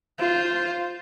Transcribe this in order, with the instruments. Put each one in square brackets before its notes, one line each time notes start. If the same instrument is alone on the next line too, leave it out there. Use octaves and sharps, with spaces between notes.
[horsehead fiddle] F4 C5